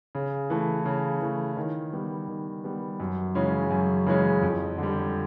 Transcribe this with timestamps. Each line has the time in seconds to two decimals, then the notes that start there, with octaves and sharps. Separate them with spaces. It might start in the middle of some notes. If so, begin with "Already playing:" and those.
0.15 C#3
0.50 E3 A3
0.85 C#3
1.21 E3 A3
1.57 D#3
1.93 G3 B3
2.28 D#3
2.64 G3 B3
3.00 F#2
3.35 C#3 E3 G#3 C#4
3.71 F#2
4.06 C#3 E3 G#3 C#4
4.42 F2
4.78 D3 G3